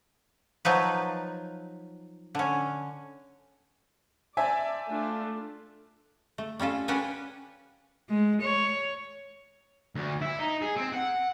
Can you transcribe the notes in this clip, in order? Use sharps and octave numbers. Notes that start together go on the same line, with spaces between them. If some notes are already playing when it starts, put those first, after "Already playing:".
F3 F#3 D#4 B4
D3 C#4
C5 D5 E5 G#5 A5
A3 D4 F4
A3
G3 C#4 F4 A4
C#4 D4 G4 B4 F#5 G#5
G#3
C#5
D2
E4
D#4
G#4
C4
F#5